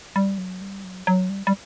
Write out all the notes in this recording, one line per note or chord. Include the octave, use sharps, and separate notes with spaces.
G3
F#3
G3
F#3
F#3
G3
G3